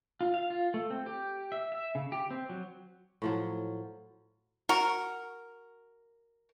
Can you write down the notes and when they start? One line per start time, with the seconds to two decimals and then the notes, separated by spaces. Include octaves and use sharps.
0.21 F4
0.34 F5
0.50 F4
0.74 A3
0.91 C4
1.06 G4
1.52 E5
1.72 E5
1.95 C#3
2.12 G4
2.31 C4
2.50 F#3
3.22 A2 F3 F#3
4.69 F#4 A#4